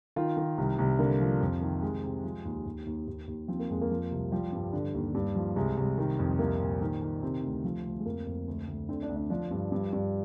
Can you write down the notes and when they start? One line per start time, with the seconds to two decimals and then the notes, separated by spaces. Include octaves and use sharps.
0.16 D#3 F4
0.37 D#3
0.58 C2
0.78 C2
0.99 D3 A#3
1.20 F3
1.41 F2
1.61 D#3
1.82 C3 G#3
2.04 C3
2.24 F3
2.45 D#2
2.66 D#2
2.86 D#2
3.07 D#2
3.27 D#2
3.48 F3 C4
3.60 A#3
3.70 F2 G#3
3.81 A#3
3.90 F3
4.11 C2
4.32 F3 G3
4.52 G2
4.73 D3
4.94 D#2
5.14 G2
5.36 F3
5.56 C2 G#3
5.77 C2
5.98 D#3
6.19 F2
6.39 C2 A#3
6.60 A#2
6.81 D#3
7.02 D#3
7.22 C3 C4
7.43 D2
7.64 F3
7.85 D2
7.99 G#3
8.06 F2 A#3
8.26 F2
8.48 D2
8.68 D2
8.89 D3 C4
9.03 D4
9.09 D2
9.16 D4
9.30 F3 D4
9.51 G2
9.72 G2
9.93 G2